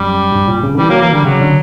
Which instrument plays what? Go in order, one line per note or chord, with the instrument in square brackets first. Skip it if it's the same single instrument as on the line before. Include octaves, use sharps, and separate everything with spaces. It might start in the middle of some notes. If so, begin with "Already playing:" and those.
Already playing: [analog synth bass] F#2 [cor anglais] G3
[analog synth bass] G2
A#2
C#3
D3
[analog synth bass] E3 [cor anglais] G3
[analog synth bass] F#3 [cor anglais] A#3
[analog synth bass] E3 [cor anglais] A#3
[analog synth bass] D3 [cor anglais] G3
[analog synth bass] C#3 [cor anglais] F#3
[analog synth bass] D3